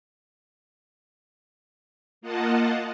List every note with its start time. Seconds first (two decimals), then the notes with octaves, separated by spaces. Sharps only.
2.21 A#3 F4 D#5 F#5 A5